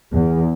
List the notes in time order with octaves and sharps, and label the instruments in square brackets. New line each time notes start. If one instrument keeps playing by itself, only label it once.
[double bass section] E2